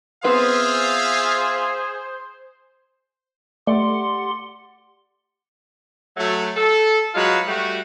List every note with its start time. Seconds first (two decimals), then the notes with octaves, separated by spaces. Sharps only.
0.24 B3 C4 F4 G#4 B4 C5 E5 F5
3.67 A3 G4 D5 F#5 C6
6.17 F#3 A3
6.55 A4
7.14 F#3 G#3 F4 F#4 B4
7.47 G3 A3 F#4